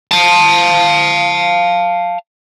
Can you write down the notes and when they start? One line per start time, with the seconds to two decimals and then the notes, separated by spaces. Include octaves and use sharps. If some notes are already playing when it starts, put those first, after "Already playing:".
0.11 F5 A5